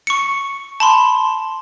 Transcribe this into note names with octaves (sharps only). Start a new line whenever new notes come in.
C#6 C#7
A5 B5 C6